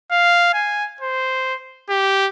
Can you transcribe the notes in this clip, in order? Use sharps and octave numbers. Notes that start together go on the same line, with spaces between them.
F5
G#5
C5
G4